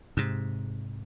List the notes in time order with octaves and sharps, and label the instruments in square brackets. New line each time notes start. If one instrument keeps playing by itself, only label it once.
[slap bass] G#2 C3